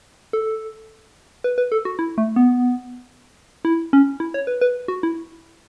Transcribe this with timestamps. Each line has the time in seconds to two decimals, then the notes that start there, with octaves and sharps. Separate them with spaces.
0.33 A4
1.44 B4
1.58 B4
1.72 A4
1.85 F#4
1.99 E4
2.18 A3
2.36 B3
3.65 E4
3.93 C#4
4.20 E4
4.34 C#5
4.47 B4
4.61 B4
4.88 F#4
5.03 E4